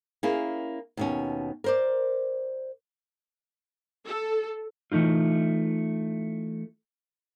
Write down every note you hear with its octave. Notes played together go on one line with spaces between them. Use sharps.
A#3 C#4 E4 G#4
D#2 B2 C#4
A#4 C5 D5
A4
E3 G3 A3 D#4 F4